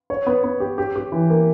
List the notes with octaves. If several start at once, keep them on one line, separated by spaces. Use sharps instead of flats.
C#5
B3
B3
G4
G4
G4
E3
A#3